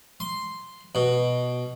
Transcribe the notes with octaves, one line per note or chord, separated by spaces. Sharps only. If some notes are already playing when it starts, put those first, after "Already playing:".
C6
B2